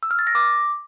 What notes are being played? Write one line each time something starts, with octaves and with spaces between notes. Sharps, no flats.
E6
F6
A6
A#6
D6